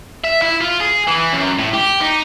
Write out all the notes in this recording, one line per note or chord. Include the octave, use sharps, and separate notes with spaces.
E5
E4
F4
G#4
E3
F#2
A2
G4
D#4